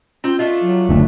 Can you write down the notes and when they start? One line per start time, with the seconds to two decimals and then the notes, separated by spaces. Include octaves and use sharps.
0.24 C4 C#4 F4 G5
0.39 A3 D4 F4 D#5
0.62 F#3
0.89 F#1 D2